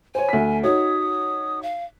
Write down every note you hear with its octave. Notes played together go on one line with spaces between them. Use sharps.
C5 C#5 G#5
D2 B6
D#4 F#4 C#5 D#6
F5